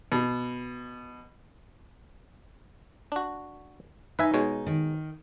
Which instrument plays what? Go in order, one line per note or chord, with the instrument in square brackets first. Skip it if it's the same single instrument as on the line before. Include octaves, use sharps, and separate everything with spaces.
[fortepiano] B2
[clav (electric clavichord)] D4 F#4
[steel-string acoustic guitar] D#4 [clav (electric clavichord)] B4 E5 G#5
[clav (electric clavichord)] B2 G#3 C#5
[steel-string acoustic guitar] D#3